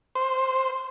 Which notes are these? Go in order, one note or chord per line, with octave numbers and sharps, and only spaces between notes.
C5